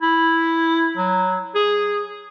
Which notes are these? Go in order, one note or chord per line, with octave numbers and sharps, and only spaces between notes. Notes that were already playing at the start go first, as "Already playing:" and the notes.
E4
F#3
G#4